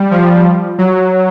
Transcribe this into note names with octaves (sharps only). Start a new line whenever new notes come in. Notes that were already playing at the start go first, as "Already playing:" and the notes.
Already playing: G3
F3
F#3